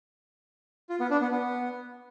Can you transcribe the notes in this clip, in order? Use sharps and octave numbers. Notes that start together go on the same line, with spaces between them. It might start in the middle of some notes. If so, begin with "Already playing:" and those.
F4
B3
D4
B3
B3